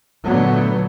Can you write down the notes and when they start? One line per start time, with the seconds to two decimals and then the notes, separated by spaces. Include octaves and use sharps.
0.25 A#2 D3 F#3 A3 B3